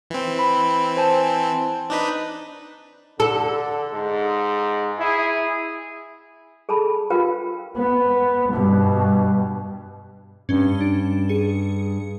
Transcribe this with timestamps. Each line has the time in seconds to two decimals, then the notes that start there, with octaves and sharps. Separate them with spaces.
0.10 E3 C4
0.39 B5
0.97 C5 G#5 A5
1.90 D4 D#4 B4
3.20 D3 A4
3.93 G#2
4.99 E4 G#4
6.69 G#4 A4 A5 B5
7.10 F4 G4 A#4 B4 F5 G5
7.77 B3
8.53 G2 B2
10.49 G2 C#4 G7
10.81 D4
11.29 G#4 C#7